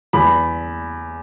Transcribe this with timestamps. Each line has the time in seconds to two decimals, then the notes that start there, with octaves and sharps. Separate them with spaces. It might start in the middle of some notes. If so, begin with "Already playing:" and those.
0.13 E2 B5